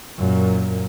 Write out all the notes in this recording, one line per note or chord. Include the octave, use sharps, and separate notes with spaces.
F#2 A#2